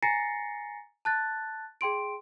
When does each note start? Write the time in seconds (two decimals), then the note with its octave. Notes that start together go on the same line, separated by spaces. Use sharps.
0.03 G#5 A#5 A6 A#6 C7 C#7
1.05 A5 F#6 A6
1.81 G#4 G5 C6 D7